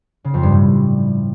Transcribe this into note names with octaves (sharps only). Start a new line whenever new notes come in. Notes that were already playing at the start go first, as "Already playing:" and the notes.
C#3
F2
G2
A2